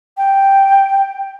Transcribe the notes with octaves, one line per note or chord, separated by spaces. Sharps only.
G5